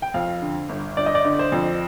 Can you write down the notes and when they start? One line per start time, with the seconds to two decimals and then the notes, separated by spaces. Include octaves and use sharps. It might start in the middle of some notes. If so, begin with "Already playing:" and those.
0.02 G5
0.14 F2 F5
0.41 D3
0.69 G1
0.97 G1 D5
1.06 D#5
1.15 D5
1.24 D3
1.39 C5
1.52 F2